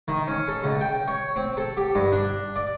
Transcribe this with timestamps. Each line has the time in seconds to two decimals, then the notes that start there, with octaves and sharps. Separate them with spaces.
0.08 D#3
0.27 C#4
0.48 A4
0.64 C#2
0.81 G5
1.08 C#5
1.36 C4
1.57 A4
1.77 G4
1.95 G2
2.12 D4
2.56 D5